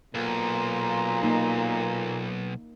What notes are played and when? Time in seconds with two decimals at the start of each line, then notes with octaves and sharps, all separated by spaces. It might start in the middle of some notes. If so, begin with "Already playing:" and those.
0.15 B1 A#2 F5 A#5 C6
1.23 A#3 D#4